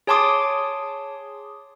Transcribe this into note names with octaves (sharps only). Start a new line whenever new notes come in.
G#4 C#5 A5 C6 D6 D#6